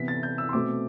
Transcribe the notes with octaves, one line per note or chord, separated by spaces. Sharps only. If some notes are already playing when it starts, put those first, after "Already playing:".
Already playing: C3 E3 B3 B6
A6
G6
E6
C6
B2 A3 C4 D6